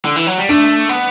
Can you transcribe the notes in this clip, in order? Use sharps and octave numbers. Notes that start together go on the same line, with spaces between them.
D3
E3
F#3
G3
A3 D4
B3